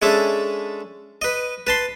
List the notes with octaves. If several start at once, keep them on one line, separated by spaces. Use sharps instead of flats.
G#3 C#4 D4 A4 E5
B4 D#5
B4 A5 C6